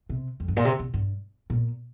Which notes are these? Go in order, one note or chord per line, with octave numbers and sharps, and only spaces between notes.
C3
F2
G2
A#2
C3
C3
G2
A#2